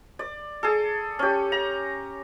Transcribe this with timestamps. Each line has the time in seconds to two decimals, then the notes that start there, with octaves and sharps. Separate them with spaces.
0.19 D5
0.63 G#4 A4
1.19 C#4 G4
1.52 A#5